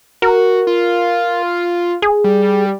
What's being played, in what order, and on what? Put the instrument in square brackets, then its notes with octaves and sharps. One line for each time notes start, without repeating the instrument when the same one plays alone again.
[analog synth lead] F#4 [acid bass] A#4
[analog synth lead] F4
[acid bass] G#4
[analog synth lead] G3